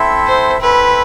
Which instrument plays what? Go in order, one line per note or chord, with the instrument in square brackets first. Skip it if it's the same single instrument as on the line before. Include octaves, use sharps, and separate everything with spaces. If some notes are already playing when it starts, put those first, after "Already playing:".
Already playing: [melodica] C4 E4 A4 E5
[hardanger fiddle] C5
[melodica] C4 E4 A4 E5 [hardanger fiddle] B4